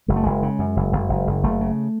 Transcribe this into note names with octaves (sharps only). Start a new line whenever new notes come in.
F#1 G#3
A3
F#1 G#3
C#3
F#2
F#1
F#1
F#1
F#1
F#1 A3
C#3